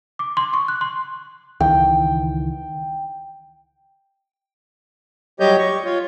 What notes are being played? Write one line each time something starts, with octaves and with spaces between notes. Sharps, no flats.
D6
C6
C#6
F#6
C6
C#2 D#3 E3 G5
F#3 G3 G4 C#5 D#5 G6
C#6
F4 C#5